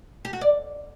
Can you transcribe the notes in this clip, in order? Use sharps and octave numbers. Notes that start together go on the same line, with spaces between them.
G4
F#4
D5